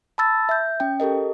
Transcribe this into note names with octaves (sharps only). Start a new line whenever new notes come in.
A5 B5 E6 A6
E5 G6
C#4 G5
G4 A4 A#4 D#5